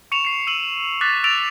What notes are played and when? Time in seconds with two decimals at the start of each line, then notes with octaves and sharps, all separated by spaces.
0.12 C#6 C#7 E7 F7
0.25 C7 C#7
0.47 E6 D#7 F7 F#7
1.01 D6 F#6 A6 B6
1.24 E6 A6 D7 F7